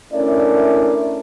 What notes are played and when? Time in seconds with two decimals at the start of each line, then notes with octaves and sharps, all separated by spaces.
0.13 A3 C#4 D4 E4 A#4 D5